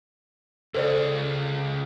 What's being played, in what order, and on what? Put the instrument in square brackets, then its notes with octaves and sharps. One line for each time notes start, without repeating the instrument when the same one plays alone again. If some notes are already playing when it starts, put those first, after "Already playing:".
[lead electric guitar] C#2 C#3 [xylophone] A4 C5 D5